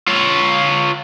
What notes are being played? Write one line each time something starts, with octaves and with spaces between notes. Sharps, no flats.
F4 C#5